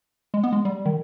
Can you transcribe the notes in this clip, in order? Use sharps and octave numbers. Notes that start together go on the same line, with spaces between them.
G#3
B3
G#3
G3
D#3